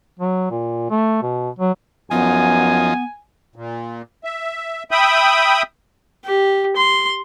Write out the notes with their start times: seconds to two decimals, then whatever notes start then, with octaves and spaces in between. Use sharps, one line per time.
0.19 F#3
0.50 A#2
0.90 A3
1.22 B2
1.59 F#3
2.11 F#2 F3 B3 D#4 G#5
3.56 A#2
4.24 E5
4.91 E5 G5 B5 D#6
6.25 G4
6.76 C6